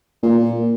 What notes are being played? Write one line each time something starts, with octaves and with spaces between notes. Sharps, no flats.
A#2